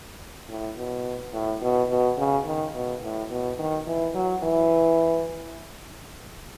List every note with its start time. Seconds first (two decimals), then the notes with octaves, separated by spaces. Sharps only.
0.49 A2
0.76 B2
1.33 A2
1.62 B2
1.89 B2
2.18 C#3
2.46 D#3
2.74 B2
3.03 A2
3.31 B2
3.59 D#3
3.87 E3
4.15 F#3
4.43 E3